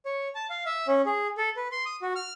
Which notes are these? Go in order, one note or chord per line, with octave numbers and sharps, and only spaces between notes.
C#5
A5
F5
E5
C#4
G#4
A4
B4
C6
D#6
F#4
F6